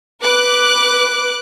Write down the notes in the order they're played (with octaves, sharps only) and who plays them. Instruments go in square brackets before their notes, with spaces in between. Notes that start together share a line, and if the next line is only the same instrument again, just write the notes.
[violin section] B4 D6 F#6